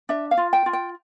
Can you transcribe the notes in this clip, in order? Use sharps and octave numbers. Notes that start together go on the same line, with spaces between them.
D4 E5
F5
F4
G5
F4
G5